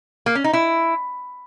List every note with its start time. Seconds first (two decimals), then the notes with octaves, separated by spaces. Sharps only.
0.26 A#3
0.35 C#4
0.44 D#4
0.53 E4